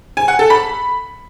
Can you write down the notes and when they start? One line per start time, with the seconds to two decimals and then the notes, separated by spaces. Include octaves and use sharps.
0.17 G#5
0.28 F#5
0.39 A4
0.50 B5